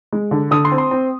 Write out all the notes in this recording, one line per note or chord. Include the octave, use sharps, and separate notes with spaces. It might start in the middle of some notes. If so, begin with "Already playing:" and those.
G#3
D3
D3 D#6
C6
C4
C6
C4